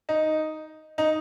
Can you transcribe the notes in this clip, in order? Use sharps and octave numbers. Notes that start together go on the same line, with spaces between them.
D#4
D#4